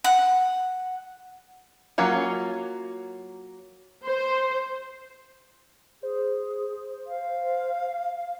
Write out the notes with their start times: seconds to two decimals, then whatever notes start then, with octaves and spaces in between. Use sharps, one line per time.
0.04 F#5
1.98 F#3 A#3 C#4 F4
4.04 C5
6.03 G#4 C5
7.07 F5